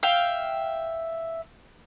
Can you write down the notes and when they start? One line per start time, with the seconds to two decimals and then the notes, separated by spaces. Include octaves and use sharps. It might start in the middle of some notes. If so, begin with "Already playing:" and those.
0.03 E5 F5 G5